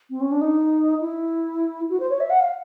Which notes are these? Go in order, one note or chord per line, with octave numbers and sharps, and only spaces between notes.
C4
C#4
D4
D#4
E4
F#4
C5
C#5
E5
F#5
F5